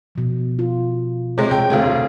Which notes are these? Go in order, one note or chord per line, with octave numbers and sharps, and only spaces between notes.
B2 F3
F4
C3 G#3 C#5
C3 G#4 G5
F1 D2 A3 G#4 F5